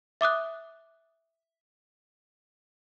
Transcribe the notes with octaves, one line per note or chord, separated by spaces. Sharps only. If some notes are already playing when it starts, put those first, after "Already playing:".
E5 D6 D#6 F#6